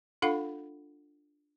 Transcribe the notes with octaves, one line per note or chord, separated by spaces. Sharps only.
D4 F4 A4 F5 F#5 B5